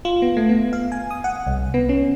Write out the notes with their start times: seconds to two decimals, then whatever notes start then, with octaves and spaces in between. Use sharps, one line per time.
0.05 F4
0.22 B3
0.37 A3
0.49 B3
0.73 F5
0.92 G#5
1.11 D#6
1.24 F#5
1.47 C2
1.74 B3
1.89 C#4